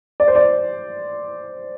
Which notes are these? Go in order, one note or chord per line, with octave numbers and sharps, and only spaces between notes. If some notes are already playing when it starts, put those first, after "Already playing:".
D5
C5
D5